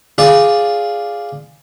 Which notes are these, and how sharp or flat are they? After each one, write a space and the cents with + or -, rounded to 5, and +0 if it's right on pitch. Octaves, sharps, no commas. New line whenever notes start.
F4 +0 G#4 +0 D5 +0